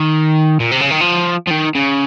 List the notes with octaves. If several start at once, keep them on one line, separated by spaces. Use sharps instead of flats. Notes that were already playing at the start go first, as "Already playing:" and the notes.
Already playing: D#3
A#2
C3
C#3
D#3
F3
F3
D#3
C#3